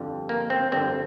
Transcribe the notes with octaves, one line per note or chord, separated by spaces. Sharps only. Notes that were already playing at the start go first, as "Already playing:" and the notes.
Already playing: G1 F2 D3 G3
A#3
C4
G1 F2 D3 G3 C4